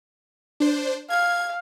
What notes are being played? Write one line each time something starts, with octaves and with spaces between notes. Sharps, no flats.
D4 C5
F5 G#6